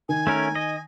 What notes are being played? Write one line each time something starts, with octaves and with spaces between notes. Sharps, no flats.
D#3 G#5
A3 C#4 A#4
D#5